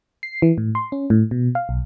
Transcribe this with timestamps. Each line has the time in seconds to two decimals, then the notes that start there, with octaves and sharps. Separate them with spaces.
0.23 C7
0.42 E3
0.58 A2
0.75 C6
0.92 C#4
1.10 A2
1.31 B2
1.55 F5
1.69 B1